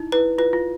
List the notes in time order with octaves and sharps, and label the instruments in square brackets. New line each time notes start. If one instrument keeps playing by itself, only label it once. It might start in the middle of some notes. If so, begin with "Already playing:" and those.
Already playing: [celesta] D#4 E4
[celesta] E4 [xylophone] B4
[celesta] F4 [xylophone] B4
[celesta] F4